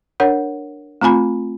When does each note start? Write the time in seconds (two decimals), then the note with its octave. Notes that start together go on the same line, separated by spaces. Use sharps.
0.20 D4 A#4 C#5 F#5
1.01 A3 C4 F4 G#5 B5